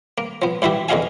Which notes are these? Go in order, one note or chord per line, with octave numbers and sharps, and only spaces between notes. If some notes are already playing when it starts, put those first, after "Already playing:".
A#3
F3 B3
G2 E3 E4 F#4 G4
E2 D3 D#4 F#4 F5 G#5